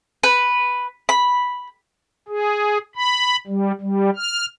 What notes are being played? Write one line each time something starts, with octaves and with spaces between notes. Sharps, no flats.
B4
B5
G#4
B5
G3
G3
F6